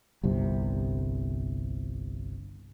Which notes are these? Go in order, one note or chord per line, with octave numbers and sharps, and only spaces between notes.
G1 C2 C3